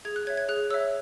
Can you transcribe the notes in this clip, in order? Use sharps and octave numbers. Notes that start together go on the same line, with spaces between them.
G#4 G#6
F#6
C#5 E5 G#6
G#6
G#4 F#6
C#5 E5 E6